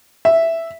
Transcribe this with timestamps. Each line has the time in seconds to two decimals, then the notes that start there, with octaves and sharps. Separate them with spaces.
0.25 E5